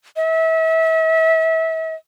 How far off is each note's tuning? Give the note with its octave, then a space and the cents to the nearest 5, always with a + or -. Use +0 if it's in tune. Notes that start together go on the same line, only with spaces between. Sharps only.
E5 -30